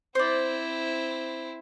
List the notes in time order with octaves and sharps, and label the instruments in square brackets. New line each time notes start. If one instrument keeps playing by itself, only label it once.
[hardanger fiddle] C4 E4 [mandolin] C5 D5